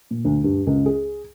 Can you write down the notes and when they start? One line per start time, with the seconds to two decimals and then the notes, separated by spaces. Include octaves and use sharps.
0.11 A#2
0.25 D2
0.44 G2
0.67 C#2
0.86 G#4